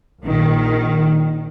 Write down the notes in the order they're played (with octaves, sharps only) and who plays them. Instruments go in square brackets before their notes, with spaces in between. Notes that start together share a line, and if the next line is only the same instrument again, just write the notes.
[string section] A#1 D#3